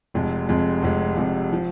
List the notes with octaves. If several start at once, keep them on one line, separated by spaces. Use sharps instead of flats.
F1 F2 C3 G#3
F1 F2 C3 G#3
F1 F2 C3 G#3
F1 F2 C3 G#3
F3